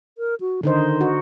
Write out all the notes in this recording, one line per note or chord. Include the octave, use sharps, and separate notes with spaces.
A#4
F#4
D3 D#3 D#4 C5
F#4